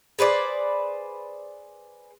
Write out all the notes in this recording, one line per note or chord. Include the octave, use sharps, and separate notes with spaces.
G#4 B4 C5 D5